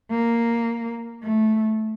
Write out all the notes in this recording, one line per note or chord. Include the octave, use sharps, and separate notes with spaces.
A#3
A3